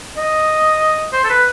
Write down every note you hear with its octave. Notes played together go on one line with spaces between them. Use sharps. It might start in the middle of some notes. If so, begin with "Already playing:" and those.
D#5
C5
A4
B4